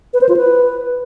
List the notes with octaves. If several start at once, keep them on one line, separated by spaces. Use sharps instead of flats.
B4
C5
F4
B4